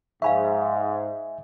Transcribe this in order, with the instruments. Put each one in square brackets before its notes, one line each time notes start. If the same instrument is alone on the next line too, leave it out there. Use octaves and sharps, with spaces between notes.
[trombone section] G#2 [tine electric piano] E5 G#5 [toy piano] F5 B5 C#6